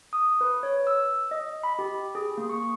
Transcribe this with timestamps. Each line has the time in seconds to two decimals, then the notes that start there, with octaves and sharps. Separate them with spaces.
0.13 D#6
0.41 B4
0.63 C#5
0.87 E6
1.31 D#5
1.64 B5
1.79 G4
2.15 G#4
2.38 A#3
2.49 C#6